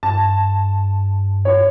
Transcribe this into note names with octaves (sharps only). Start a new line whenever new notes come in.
G2 A5
C#5